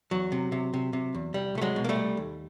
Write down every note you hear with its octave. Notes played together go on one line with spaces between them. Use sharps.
E2 F#3
C3
C3
C3
C3
E2
C2 G3
C2 A3
F#3 G#3
B2
A#3
G3 A3
C2
D#2